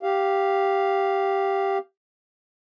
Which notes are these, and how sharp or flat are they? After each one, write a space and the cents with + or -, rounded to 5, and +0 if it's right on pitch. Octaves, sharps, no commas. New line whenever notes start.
G4 +0 F5 +0